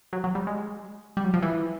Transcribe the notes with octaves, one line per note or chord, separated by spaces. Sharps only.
F#3
F#3
G3
G#3
G3
F#3
F3
E3